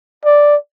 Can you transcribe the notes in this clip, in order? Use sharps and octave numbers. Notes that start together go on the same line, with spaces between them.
D5